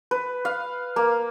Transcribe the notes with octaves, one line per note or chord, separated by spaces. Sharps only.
B4
F5
A#3